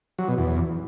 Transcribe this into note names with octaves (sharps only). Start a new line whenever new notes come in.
F#3
B2
E2